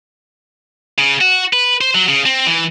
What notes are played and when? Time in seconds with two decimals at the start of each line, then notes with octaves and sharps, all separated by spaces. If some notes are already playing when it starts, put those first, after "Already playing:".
0.98 C#3
1.21 F#4
1.53 B4
1.81 C5
1.95 F#3
2.09 C#3
2.26 C4
2.47 E3